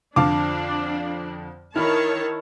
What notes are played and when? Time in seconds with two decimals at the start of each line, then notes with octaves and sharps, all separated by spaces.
0.16 F2 D3 D4 F5 A5 D6
1.76 D#3 E4 C#5 A5 B5 F6